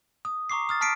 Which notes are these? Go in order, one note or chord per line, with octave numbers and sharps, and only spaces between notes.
D#6
A#5 C#6 D6 C7
D#6 F6 A6
A5 F6 B6 C7 D7